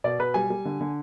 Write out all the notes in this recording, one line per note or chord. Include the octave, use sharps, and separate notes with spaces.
B2 D5
B2 B4
G3 G#5
G3
D3
D3